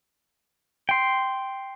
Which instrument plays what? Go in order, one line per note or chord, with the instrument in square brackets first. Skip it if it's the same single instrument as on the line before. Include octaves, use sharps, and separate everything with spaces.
[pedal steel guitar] G5 C6